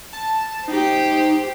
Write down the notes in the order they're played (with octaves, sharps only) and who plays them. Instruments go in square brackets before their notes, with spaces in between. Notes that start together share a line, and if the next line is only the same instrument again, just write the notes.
[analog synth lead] A5
[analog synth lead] D#4 [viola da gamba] G4 C5